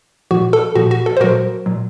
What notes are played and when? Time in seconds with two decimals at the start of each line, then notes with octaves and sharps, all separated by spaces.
0.31 A#2 F3 F#4
0.53 A4
0.75 A#2 F3 F#4
0.91 F#4
1.06 A4
1.17 C5
1.20 A#2 F#3 F#4 A#4
1.66 A#2 F#3